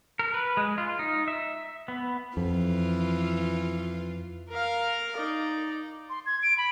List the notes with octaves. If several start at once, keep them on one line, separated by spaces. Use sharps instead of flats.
A#4
B4
G#3
F4
D#4
E5
B3
F2 E3 F4
A#4 F5
D#4 D5
C6
G#6
D7
B5